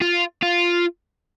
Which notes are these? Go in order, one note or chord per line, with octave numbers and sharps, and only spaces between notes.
F4
F4